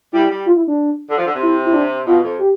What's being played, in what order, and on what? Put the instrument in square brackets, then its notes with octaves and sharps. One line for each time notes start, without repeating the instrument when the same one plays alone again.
[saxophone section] G3 [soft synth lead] E4
[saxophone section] G3
[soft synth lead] F4
E4
D4
[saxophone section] D3
F3
D3
C3
[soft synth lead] E4
E4
D4
[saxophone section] B2 [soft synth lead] F4
[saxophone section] F2
[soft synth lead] G4